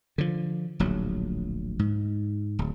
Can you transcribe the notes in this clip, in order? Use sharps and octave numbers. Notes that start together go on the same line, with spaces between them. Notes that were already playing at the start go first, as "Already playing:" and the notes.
D3 F3
D1 A#1 F#3
G#2
D1